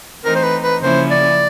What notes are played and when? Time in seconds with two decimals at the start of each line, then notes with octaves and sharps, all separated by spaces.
0.25 E3 A3 C4 D#4 A#4
0.35 C5
0.43 B4
0.63 B4
0.82 C#3 F3 A#3 C#4 E4 C5
1.10 D5